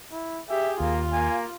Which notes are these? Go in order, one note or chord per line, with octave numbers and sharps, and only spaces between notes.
E4
G4 G#4 E5
D#2 A#3 F4
A#3 G#5